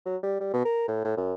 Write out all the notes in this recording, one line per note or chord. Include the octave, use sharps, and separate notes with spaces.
F#3
G3
G3
B2
A#4
A2
A2
F#2